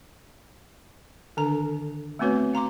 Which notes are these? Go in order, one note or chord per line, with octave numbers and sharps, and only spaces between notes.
D3 D#3 D4 A4 A#5
A3 B3 C4 F#4 B4 C#5
F5 A#5 C6 D6